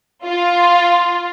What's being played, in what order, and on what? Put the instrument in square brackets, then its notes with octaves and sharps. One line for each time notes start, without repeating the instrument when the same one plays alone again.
[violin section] F4